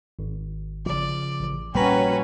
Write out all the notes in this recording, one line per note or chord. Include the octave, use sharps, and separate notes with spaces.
G#1
C#3 F3 D5
A1
A#1 G3 A#3 C#4 F#4 B4 G5 A#5